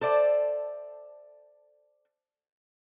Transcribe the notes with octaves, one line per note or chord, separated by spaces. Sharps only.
A4 C5 D5 E5